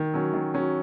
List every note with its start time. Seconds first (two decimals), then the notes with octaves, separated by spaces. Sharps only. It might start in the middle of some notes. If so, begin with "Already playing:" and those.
Already playing: D#3
0.14 F#3 C#4
0.33 D#3
0.54 F#3 C#4